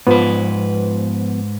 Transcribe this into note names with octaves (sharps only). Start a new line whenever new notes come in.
G#2 F3 B3 B4